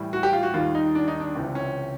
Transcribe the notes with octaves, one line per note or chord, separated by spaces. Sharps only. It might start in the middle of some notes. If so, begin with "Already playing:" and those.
Already playing: A2 E3 G3
F#4
G4
F4
F#4
D#2 D#3 G3 F4
D#4
D4
D#4
D4
C#2 C3 E3
C#4